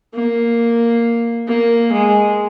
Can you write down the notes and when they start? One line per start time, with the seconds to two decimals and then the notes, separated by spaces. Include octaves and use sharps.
0.14 A#3
1.48 A#3
1.92 G#3